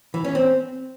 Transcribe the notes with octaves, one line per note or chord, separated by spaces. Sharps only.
E3
C#4
C4